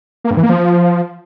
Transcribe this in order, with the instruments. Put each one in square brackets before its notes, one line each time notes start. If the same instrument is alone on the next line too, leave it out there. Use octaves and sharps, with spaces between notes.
[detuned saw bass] A#3
G2
E3
A#3
F3